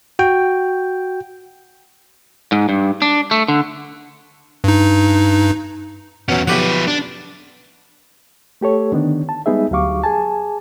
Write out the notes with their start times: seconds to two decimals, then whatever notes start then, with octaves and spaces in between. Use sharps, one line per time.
0.19 F#4 G5
2.52 G#2
2.69 G2
3.02 D4
3.31 A3
3.48 D3
4.64 G2 D#4
6.29 E2 B2 F#3 C#4
6.47 B1 F3 G4 B4 F#5
6.88 D4
8.61 A3 G4 A4 C#5
8.92 D3 D#3 B3 D4
9.29 A5
9.46 G3 G#3 B3 D#4 G#4 E5
9.71 D2 F#3 G4 F5 C#6 D6
10.04 G#4 G#5 A5